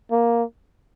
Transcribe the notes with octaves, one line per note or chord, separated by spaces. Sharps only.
A#3